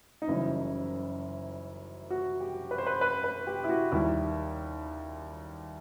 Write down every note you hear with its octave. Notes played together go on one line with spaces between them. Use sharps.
D#4
F#1 F#2 E3 G3 E4
F#4
G4
B4
C5
B4
B4
B4
G4
E4
F#4
D#2 D#3 G3 E4